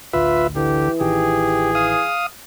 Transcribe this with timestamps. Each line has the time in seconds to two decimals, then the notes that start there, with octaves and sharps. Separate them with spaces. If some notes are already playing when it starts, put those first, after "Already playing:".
0.13 A1 D2 F4 B4 E5
0.56 D3 E3 G4
1.01 A1 D#3 G4 G#4
1.75 F5 D#6